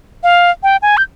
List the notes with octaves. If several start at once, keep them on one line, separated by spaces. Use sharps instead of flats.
F5
G5
G#5
G6